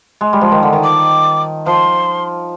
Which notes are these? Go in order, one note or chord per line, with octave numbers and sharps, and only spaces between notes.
G#3
G3
F3
D#3
D3
D#3
D6
F3 C6